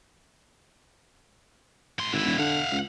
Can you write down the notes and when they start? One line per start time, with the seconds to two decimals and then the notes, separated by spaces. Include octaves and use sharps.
1.99 A2 C6
2.12 G#1 D3 E4
2.25 E1
2.38 D3 F5 F#5
2.72 C#2